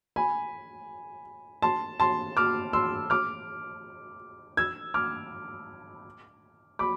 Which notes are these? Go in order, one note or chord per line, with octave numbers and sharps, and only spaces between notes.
G#5 B5
A5 C6
A5 C6
D6 F6
C6 E6
D6 F6
E6 G#6
D6 F6
B5 D6